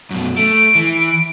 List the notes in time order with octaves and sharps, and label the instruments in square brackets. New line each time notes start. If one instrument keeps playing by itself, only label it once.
[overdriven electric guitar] F#2 B2
[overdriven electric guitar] A3 [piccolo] D7
[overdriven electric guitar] E3